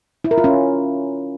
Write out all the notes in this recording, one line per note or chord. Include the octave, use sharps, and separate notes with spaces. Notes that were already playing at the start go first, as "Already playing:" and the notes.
E4
A#4
F4
C#4